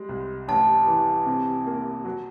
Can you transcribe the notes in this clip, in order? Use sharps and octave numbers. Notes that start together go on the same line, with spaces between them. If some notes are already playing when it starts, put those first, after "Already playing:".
Already playing: G3 G#3
C2
A1 A5
E3
C3
A#3
F#3